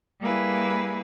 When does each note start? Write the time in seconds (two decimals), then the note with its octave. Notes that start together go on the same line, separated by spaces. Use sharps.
0.19 G3 A#3 E4 G#4 B4